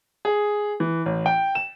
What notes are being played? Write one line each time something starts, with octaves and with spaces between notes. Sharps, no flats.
G#4
E3
A1
G5
E7